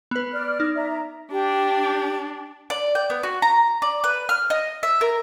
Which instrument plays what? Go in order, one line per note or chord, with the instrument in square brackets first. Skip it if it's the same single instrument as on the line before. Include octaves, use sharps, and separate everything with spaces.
[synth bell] B3 B4
[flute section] D5 F6
[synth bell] D#4
[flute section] D5 E5 A#5
[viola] D4 [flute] G4
[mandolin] D5
G5
B3
F#4
A#5
D5
B4
F6
D#5
E5
A#4